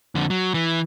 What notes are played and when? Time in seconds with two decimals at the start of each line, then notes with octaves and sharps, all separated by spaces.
0.15 F2 D3
0.30 F#3
0.54 E3